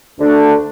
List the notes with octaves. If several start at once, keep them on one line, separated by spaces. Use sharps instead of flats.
D2 D3 A3 D4